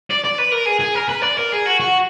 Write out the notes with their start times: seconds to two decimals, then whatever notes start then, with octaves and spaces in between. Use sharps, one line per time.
0.10 D5
0.24 D5
0.38 B4
0.52 A#4
0.66 G#4
0.80 G#4
0.95 A#4
1.09 B4
1.23 D5
1.37 A#4
1.52 G#4
1.66 F#4
1.80 F#4